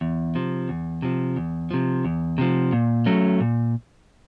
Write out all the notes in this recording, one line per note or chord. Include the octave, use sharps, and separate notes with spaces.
E2
C3 F3
E2
C3 F3
E2
C3 F3
E2
C3 F3
A#2
F#3 A3 C#4
A#2